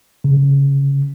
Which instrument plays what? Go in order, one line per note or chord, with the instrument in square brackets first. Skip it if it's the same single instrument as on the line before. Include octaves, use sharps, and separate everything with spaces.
[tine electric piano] C#3